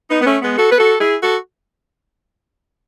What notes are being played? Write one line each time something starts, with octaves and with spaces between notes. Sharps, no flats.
B3 D#4
B3
A3 C#4
G#3 B3
F#4 A4
B4
F#4 A4
E4 G#4
F#4 A4